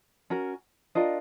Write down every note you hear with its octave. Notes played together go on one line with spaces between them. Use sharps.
C#4 F#4 A#4
D4 F4 A#4 D#5